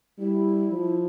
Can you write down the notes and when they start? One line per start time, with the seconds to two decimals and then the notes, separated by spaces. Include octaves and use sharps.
0.19 G3 E4
0.70 F3